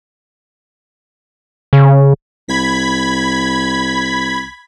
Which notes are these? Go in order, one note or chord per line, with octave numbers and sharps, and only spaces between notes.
C#3
C2 B5 G#6 B6